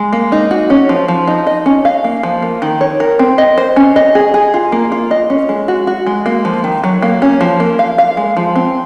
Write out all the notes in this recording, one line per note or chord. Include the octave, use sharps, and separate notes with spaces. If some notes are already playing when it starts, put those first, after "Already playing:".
Already playing: G#3
A#3
D#4
F#4
C#4
F3
F3
D#4
D#5
C#4
F5
A#3
F3
A#3
D#3
C#5
A#4
C4
D#5
C5
C#4
D#5
G#4
G#4
F4
A#3
F4
D#5
C#4
G#3
F#4
F#4
G#3
A#3
F3
D#3
F#3
A#3
C#4
F3
A#3
F5
F5
G#3
F3
C4